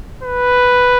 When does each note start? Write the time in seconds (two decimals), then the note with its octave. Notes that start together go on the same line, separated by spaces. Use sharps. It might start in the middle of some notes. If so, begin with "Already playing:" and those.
0.23 B4